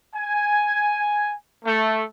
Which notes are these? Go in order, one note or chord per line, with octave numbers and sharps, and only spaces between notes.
G#5
A3